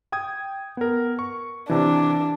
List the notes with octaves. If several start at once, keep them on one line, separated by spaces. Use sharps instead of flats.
G5 D#6 G#6
B3 A#4
C#6
C3 E3 D4